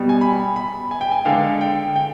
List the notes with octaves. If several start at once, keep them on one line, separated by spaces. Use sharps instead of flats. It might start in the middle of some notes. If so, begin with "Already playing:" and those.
Already playing: B2 G3
G#5
B5
B5
G#5
G5
G#5
D3 G#3 F5
G5
G5